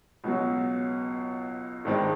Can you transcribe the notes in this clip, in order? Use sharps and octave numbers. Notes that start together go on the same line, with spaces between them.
C#2 B2 F#3
G#1 G2 D#3 G#3 C4